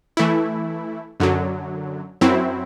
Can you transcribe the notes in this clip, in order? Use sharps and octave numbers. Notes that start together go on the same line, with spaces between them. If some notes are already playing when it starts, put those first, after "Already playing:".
E3 A3 E4
F#2 D3 F#3
F#2 F#3 C4 E4